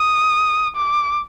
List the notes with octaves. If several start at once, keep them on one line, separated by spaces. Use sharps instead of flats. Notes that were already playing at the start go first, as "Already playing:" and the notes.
Already playing: D#6
D6